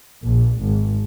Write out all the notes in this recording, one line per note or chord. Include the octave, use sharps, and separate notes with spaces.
A#1
G#1